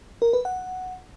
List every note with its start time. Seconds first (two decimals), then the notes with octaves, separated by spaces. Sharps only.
0.22 A#4
0.33 B4
0.45 F#5